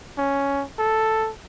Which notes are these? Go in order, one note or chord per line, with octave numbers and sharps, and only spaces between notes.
C#4
A4